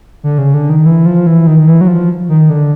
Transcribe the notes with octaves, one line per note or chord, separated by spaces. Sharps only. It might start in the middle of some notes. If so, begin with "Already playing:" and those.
D3
C#3
D3
D#3
E3
F3
E3
D#3
E3
F#3
F3
D#3
D3